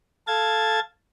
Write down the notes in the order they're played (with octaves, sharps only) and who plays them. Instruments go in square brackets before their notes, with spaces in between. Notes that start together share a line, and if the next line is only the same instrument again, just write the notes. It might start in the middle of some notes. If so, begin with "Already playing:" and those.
[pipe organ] A4 F5 A5 G#6 A6